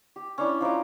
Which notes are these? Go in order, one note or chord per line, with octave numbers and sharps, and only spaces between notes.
G4
C#4 D4 E4
F3 D#4 C#5 D6